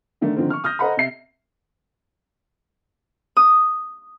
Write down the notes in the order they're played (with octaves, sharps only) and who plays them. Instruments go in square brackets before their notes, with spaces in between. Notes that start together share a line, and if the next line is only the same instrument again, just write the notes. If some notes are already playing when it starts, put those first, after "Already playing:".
[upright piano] D3 D#3 A3 D4
D3 D#3 F3 A#3 C4
C#6 F6
D#6 F6 G6 A#6
A4 C5 D#5 F#5 A#5 B5
C3 E5 C7
[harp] D#6